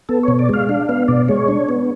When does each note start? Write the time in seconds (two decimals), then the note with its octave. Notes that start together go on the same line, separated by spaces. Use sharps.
0.09 B3 A4
0.23 B2 C#5
0.39 D5
0.49 G#3 F5
0.69 D4 F5
0.89 B3 F5
1.08 B2 D5
1.29 G#3 C#5
1.48 D4
1.69 B3